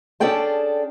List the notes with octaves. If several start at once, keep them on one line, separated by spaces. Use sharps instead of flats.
C#4 D4 G#4 A4 G5 A5